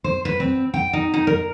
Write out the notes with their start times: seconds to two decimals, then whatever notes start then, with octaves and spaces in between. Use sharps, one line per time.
0.04 C5
0.25 B4
0.40 C4
0.74 G5
0.93 D#4
1.14 D#4
1.27 A#4